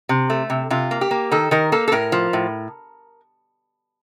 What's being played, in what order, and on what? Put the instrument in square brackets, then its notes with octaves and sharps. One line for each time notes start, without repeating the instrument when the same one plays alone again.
[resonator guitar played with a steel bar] C3
A3
C3
C3 F4
A#3
G4
A#3
D#3 A4
D#3 A#4
A#3 A4
A4
A2 A#4
F3
A2